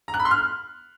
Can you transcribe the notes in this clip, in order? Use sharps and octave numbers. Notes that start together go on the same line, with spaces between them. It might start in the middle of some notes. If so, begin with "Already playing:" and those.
A#5
F#6
B5
C6
F6